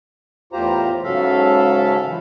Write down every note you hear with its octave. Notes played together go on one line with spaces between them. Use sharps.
E2 A2 F4 G4 C5 A#5
G#2 C#3 F#3 A4 E5 F5
E3 F3